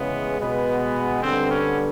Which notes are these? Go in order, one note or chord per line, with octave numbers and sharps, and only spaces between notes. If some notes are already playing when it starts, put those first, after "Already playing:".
Already playing: C#3 E3 G#3 B3
B2 G#3 B3
D3 G3 B3 C4
C#4